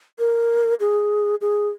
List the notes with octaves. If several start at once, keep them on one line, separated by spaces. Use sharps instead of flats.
A#4
G#4
G#4